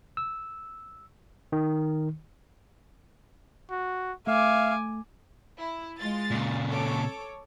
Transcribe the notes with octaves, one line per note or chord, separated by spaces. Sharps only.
E6
D#3
F#4
A3 E5 F5 G#5 D6
E4
G#3 F4 A6
A#2 C#3
A4 C#5 D6